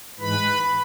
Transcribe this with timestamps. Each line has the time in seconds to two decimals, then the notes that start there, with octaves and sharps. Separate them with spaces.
0.20 G#2 E3 G#3 B4 B5